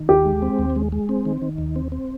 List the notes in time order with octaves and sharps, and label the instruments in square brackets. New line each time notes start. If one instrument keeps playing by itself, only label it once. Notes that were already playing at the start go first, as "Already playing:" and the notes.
Already playing: [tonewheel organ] D#3
[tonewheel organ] D#2 [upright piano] G4
[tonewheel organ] G#3
C4
D#2
G#3
G#3
C4
D#3
D#3
D#2
C4
C4